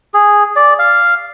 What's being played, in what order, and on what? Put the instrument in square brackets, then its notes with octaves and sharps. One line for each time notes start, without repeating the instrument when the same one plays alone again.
[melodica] G#4
D5
F5